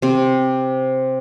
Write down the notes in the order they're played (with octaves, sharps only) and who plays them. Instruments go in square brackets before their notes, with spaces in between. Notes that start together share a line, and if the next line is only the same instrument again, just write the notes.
[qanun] C3 C4